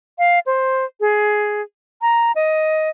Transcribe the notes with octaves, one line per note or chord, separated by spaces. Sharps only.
F5
C5
G#4
A#5
D#5